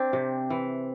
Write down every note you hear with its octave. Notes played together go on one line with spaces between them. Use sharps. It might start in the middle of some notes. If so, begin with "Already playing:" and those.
Already playing: C4 D4
C3
E3